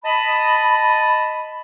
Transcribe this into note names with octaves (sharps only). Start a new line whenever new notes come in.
D#5 A5 B5